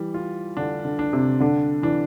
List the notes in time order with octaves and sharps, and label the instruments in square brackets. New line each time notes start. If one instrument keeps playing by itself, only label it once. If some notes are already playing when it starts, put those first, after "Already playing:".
Already playing: [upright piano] E3 [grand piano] G3
[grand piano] F4
[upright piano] D3 [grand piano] D4
[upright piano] D3
[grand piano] D4
[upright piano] C3
[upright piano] D3 [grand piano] D4
[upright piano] E3 [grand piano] D4